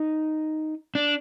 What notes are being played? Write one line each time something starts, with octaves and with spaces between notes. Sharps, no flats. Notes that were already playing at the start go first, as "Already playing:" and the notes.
Already playing: D#4
D4